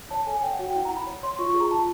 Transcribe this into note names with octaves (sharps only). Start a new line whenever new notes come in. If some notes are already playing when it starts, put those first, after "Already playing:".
C#5 A5
A4 G#5
C#5 G5
F#5
F#4
G5
E4 F#5
A#5
E4
B5
C#5
C#5 C6
F4 C#6
C#6
G#4
A#5
F4 A5